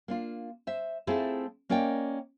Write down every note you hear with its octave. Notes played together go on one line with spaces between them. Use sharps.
A#3 D4 F4
C5 E5
A3 C4 E4 F4 G#4 A4
A#3 C#4 A#4 D5 D#5 G5